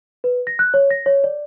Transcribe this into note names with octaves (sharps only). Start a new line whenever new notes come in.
B4
A#6
F#6
C#5
A#6
C#5
D5